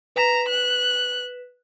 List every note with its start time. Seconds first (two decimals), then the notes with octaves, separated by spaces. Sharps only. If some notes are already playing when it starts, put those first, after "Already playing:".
0.16 B4 A#5 B6 E7
0.48 F#6